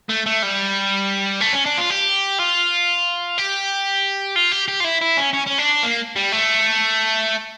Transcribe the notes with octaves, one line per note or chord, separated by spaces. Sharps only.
A3
A3
G3
A3
C#4
D4
F4
G4
F4
G4
F4
G4
G4
F4
E4
E4
C#4
C#4
C#4
D4
A#3
G3
A3